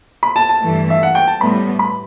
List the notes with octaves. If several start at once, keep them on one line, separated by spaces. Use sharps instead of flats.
B5
A5
A5
G2 E3 A3
E5
F#5
G5
A5
A2 G3 B3 B5
B5